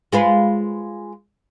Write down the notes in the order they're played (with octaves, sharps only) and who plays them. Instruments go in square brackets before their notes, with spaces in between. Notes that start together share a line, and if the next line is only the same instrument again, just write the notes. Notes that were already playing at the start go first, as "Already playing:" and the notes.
[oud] G#3 F4 B4